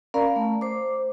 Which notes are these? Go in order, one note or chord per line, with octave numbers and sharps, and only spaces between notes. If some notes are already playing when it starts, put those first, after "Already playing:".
C#4 A#4 D5 F5 A#5 B5
A3
C5 D6